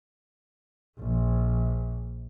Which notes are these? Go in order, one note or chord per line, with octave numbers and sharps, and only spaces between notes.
A#1